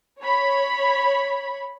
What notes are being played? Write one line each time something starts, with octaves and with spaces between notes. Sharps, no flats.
C#5 B5